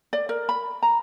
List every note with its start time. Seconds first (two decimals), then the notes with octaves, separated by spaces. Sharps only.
0.13 D5
0.29 A#4
0.49 B5
0.83 A#5